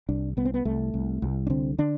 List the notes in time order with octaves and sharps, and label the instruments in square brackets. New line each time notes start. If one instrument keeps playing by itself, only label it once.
[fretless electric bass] C2 D4
C2 B3
C4
B3
C2 A3
C2
C2
D4
D3 C4
D3 D4